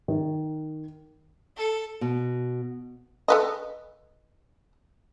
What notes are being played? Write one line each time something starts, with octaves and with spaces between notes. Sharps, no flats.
D#3
A4
B2
A4 B4 D#5